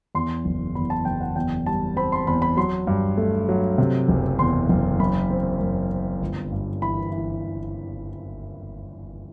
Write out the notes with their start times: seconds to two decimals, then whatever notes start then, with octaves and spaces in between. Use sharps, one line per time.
0.15 E2 C6
0.45 F#1
0.75 E2 B5
0.90 A5
1.05 F#1 G5
1.21 F#5
1.36 E2 G5
1.66 G3 A5
1.96 C4 B5
2.12 C6
2.27 E2 B5
2.42 B5
2.57 F#3 C6
2.87 G2
3.18 A3
3.49 F#3
3.78 C3
4.08 F#1
4.39 E2 C6
4.69 F#1
5.00 F#2 B5
5.31 C4
5.61 F#2
5.90 C4
6.21 G1
6.52 G2
6.82 E3 B5
7.12 E3